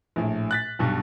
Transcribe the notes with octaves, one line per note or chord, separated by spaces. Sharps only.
A#1 A2
F#6 A6 B6
B1 G2 B2